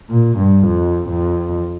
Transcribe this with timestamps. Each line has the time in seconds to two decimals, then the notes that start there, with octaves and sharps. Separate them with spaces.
0.10 A#2
0.38 G2
0.67 F2
1.09 F2